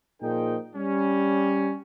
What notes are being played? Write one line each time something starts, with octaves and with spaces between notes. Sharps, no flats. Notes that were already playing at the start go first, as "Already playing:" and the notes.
A#2 F3 D#4 G#4 A#4 G5
G3 C#4